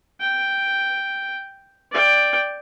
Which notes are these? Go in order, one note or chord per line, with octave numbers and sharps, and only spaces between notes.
G5
D5 G5